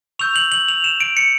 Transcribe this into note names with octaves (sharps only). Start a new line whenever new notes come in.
C#6 E6 G6 F7
F#7
F#7
F7
E7
D7
C#7